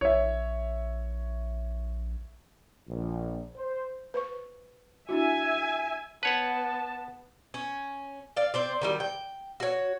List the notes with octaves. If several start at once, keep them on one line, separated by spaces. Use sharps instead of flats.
A#1 C#5 E5
A#1
C5
B4 C5 C#6
D4 E4 F#4 E5 G#5
B3 B4 C#5 F#5 A5
C#4
D5 F5
C4 C5 D5
D#3 F#3 G3
G5
F#4 C#5